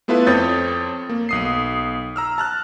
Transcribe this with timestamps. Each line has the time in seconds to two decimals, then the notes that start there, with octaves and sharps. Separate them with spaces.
0.08 A3 B3 E4 F4 A4 B4
0.27 F2 C4 C#5 D#6 G6 A6
1.09 A#3
1.29 B1 D#6 C7
2.16 A#5 E6 F6
2.38 A5 F6 F#6